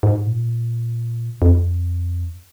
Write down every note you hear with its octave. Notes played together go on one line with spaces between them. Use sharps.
G#2
A#2
F2